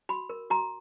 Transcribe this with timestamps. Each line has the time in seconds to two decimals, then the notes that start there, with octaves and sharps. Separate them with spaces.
0.09 F#4 B5
0.30 A#4
0.50 F#4 A#5